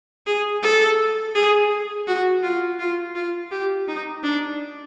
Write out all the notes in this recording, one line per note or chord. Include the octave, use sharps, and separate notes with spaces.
G#4
A4
G#4
F#4
F4
F4
F4
G4
D#4
D4